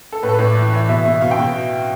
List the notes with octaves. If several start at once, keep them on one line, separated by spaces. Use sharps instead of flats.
A4
A2 B4
A4
A2 B4
D5
E3
E3
B2 E5
B2 E5
B2 F5
G5
B2